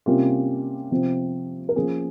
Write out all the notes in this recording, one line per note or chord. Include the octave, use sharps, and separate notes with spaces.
C3 G3 A#3 C#4 F4
C3 F3 C4
A#4
F3 A#3 C#4 G#4